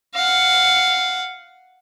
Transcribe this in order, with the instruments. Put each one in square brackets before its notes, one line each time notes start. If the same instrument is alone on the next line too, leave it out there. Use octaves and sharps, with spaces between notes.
[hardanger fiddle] F5 F#5